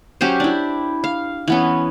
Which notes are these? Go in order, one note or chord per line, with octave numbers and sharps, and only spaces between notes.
F#3 C#4 G4 C5
D4 E4
F5
E3 B3 C#4